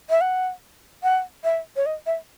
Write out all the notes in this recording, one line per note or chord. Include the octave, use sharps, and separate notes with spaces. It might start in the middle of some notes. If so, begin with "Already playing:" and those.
E5
F#5
F#5
E5
C#5
D#5
E5